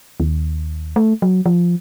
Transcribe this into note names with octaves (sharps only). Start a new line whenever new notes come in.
D#2
A3
F#3
F3